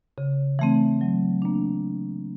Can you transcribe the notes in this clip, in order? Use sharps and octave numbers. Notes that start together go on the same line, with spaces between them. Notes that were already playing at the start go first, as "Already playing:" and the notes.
C#3
E3 A3 C4
F#3
A#3 D4